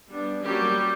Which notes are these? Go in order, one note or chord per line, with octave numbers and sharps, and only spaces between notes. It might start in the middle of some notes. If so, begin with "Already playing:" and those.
G3 B3 D4
F#3 G3 A#3 C#4 G4